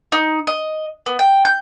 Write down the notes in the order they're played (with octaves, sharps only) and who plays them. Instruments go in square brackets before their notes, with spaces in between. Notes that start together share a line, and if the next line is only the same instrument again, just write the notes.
[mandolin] D#4
D#5
B3
G5
G6